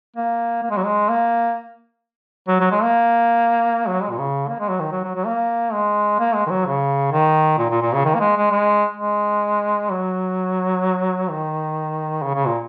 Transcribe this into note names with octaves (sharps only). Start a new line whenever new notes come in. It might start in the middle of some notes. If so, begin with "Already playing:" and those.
A#3
A#3
G#3
F#3
G#3
A#3
F#3
F#3
G#3
A#3
F#3
G#3
A#2
C#3
A#3
G#3
F#3
D#3
F#3
F#3
F#3
A#3
G#3
A#3
G#3
D#3
F#3
C#3
D#3
A#2
A#2
A#2
C#3
D#3
A#3
G#3
G#3
G#3
G#3
F#3
D#3
C#3
C#3
A#2